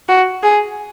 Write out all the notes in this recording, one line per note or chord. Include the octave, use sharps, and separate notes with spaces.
F#4
G#4